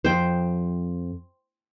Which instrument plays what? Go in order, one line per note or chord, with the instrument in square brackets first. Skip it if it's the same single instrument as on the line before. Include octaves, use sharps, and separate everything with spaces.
[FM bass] F2 [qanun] C5 G5